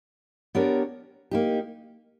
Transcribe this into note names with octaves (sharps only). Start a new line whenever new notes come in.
B3 D4 G4 A#4 C#5
A#3 D#4 G4